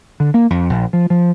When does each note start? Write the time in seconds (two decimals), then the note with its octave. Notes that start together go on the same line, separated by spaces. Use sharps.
0.20 D3
0.34 A#3
0.50 F2
0.70 A#1
0.93 F3
1.10 F3